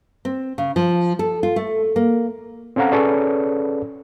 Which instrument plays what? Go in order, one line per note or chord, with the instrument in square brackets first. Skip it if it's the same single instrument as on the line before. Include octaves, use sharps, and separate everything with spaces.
[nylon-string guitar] C4
C#3
F3
A4
F4
A3
A#3
[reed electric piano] C4 C#4 A4 F5 F#5 A#5
C#4 G#4 A4 B4 C#5 D5